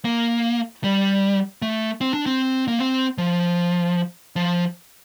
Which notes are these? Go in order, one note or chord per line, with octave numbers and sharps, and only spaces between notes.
A#3
G3
A3
C4
D4
C4
A#3
C4
F3
F3